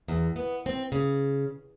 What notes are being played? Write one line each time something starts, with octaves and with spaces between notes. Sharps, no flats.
E2
B3
C4
C#3